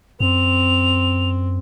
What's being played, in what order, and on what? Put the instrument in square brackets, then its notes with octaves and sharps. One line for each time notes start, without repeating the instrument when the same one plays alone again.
[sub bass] F#2 [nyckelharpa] C4 [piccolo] F7